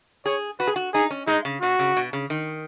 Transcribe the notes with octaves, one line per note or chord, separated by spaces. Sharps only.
G#4 C#5
F#4 B4
G#4
F#4
D#4 G#4
C#4
G#3 D#4
C#3
B2 F#4
C#3
B2
C#3
D#3